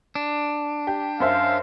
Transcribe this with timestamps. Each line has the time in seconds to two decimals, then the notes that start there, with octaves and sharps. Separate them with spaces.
0.15 D4
0.87 G4
1.20 F#2 C5 E5 F5